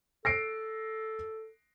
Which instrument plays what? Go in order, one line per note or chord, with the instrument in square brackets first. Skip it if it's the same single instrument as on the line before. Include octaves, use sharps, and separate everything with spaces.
[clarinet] A4 [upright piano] A#6 C7 D7